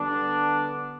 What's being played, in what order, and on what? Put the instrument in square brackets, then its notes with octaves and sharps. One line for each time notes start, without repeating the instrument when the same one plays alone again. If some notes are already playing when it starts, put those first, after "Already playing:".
Already playing: [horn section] D3 G3 B3 D4